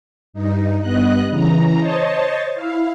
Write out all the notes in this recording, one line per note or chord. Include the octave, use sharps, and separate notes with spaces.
G2 D#4
G2 B3 D#5 F#6
C#3 E3 A#5
C5 C#5 D#5 A5
E4 F5